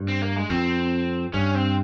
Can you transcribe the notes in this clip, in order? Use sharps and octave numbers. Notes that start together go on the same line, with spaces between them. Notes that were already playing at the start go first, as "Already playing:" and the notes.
Already playing: G2
C4
A#3
G#3
F2 C4
G2 C#4
C4